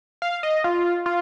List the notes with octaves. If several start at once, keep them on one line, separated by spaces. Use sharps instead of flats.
F5
D#5
F4
F4